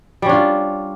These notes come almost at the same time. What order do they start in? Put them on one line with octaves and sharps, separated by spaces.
G3 C#4 D4 F4